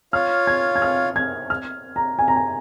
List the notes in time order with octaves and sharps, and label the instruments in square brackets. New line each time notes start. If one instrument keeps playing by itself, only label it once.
[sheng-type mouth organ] F4 C#5 F5 [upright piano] F6
[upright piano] G#6
G#6
F6
G#6
F6
A#5
G#5
A#5
G#5